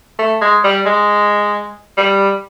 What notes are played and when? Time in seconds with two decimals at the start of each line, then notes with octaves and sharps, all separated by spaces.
0.19 A3
0.41 G#3
0.64 G3
0.86 G#3
1.98 G3